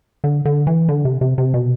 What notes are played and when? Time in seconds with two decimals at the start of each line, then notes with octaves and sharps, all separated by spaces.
0.24 D3
0.45 D3
0.67 E3
0.89 D3
1.05 C3
1.21 C3
1.38 C3
1.54 B2